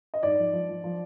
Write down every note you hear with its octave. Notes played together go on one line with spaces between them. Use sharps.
D#5
G#2 D5
F3
F3
F3
F3